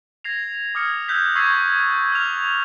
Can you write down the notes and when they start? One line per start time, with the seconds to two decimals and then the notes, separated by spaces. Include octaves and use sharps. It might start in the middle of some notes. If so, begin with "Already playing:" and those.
0.24 G#6 A#6 C7 F7
0.75 D6 D#6 F6 G#6 C#7
1.08 E6 F#6 G6 B6
1.36 C#6 E6 G#6 A6 B6 C7
2.12 E6 F6 F7